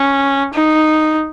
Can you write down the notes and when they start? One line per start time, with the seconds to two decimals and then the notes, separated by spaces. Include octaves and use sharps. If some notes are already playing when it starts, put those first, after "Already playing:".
Already playing: C#4
0.54 D#4